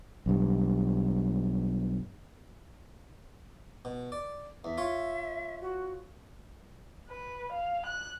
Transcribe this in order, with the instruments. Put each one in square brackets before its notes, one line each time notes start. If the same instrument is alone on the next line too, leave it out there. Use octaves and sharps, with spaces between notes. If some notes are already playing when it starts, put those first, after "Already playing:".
[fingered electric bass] B1 G2
[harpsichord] B2
D5
[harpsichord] E2 [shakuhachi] E5
[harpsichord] F4 C#5
[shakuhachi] F#4
[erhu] B4
F5
F#6